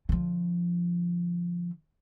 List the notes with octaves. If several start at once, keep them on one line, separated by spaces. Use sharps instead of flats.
D3 F3